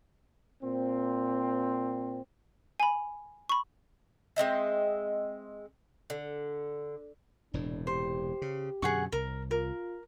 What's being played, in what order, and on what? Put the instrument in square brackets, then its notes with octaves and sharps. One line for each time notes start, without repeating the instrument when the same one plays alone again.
[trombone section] A#2 C4
[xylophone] G#5 B5
B5 C#6
[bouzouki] G#3 C4 D#5 E5
D3
[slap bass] E1 A2 C3 [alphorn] D4
[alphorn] G4 [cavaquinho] C5
[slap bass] C#3
[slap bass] F#2 B2 D3 [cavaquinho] G#4 F#5 C#6
[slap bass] C2 [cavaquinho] A#4
[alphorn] F4 [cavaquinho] A#4